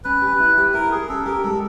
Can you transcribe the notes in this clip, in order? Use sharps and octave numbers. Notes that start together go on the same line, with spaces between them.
C#4 B4
G4
E4
G4
E4 A#4
G4 G#4
C#4 A4
G4 A#4
G#3 A4